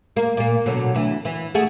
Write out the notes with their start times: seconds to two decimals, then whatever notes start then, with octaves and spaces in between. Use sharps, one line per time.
0.16 A#3
0.37 A#2 A#3
0.66 B2 D3 F#3
0.95 D2 E3
1.25 E3
1.54 A3 F#4 G#4